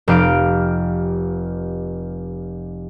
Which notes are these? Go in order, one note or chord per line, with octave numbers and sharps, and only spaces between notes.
F1 G4 F5 D7